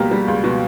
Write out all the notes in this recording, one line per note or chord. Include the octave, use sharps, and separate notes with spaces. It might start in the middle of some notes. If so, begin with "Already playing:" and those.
Already playing: C#2 B2 G3 A#3 G4
G3
C#2
B2